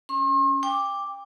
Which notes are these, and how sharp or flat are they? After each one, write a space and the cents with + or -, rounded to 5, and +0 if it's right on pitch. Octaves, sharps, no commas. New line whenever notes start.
C#4 +15 C6 +45
G5 +25 D6 +0